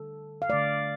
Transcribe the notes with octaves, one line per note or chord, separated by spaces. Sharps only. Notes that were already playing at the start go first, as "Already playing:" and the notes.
Already playing: D3 G3 A4
F5
D3 A3 D5